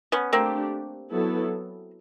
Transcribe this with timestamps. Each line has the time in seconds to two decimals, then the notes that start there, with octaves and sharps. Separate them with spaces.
0.12 B3 C#4
0.32 A3 A#3 C4 D4 G4
1.11 F#3 B3 E4 A4